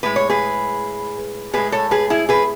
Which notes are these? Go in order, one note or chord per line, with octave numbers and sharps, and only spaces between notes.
A2 G#3 B4
C#5
G#4 B4
A2 G#3 G#4 B4
A4 C#5
G#4 B4
E4 G#4
G#4 B4